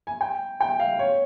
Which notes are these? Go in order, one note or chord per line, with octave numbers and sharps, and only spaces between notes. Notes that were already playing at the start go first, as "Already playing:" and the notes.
G#5
G5
G5
F5
C#5